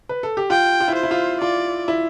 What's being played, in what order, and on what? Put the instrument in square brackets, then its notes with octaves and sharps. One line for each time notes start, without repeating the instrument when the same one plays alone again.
[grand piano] B4
A4
G4
[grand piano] F4 [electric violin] G5
[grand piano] F4
E4
[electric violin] C5
[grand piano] E4
F4
[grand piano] F4 [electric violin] D5
[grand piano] E4